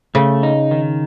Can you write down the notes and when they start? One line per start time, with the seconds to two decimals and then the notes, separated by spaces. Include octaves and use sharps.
0.15 C#3 A3
0.43 D#4
0.71 D#3